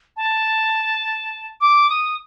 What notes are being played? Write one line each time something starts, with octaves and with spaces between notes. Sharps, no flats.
A5
D6
D#6